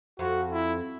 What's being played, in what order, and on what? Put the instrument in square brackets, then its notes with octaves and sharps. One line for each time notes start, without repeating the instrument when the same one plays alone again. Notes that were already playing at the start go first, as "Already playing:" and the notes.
[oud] F2 [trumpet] F#4
[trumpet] E4